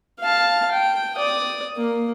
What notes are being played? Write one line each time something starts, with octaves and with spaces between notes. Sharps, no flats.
F5 A5
G5
D5 D#6
A#3